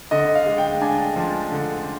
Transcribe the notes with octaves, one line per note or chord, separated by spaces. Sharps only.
D3 D#5
F5
G#3
G5
D4 G#5
F3
D3